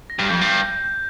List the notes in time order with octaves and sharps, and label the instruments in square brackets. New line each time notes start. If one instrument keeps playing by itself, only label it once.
[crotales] A#6
[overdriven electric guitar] G2
[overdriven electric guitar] F2 [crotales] G6
[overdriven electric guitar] G2
[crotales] G6
G6
G6